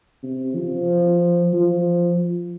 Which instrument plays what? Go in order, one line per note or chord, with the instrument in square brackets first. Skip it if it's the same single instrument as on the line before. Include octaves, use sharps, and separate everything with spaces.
[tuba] C3
F3
F3